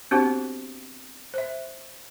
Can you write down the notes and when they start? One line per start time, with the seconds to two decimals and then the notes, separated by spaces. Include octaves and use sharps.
0.11 B3 C4 D4 F#4 G4 C5
1.34 C5 E5